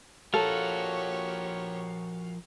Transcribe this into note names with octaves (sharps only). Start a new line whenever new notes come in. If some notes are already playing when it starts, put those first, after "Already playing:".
F3 F#4 G4 A4 A#4 C#5 F5